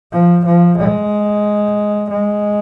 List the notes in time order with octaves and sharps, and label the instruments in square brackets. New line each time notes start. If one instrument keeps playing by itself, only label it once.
[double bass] F3
F3
G#3
G#3